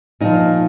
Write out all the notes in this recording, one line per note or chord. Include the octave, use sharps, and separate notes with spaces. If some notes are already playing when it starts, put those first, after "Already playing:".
A#2 F3 D#4